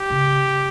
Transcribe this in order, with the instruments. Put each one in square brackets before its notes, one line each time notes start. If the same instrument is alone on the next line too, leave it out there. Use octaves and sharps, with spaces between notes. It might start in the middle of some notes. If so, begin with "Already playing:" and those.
Already playing: [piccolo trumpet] G4
[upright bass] C#3